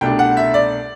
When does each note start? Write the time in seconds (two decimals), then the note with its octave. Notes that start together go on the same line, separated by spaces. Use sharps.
0.01 C2 B2 A3 D4 G5
0.19 F#5
0.37 E5
0.54 D5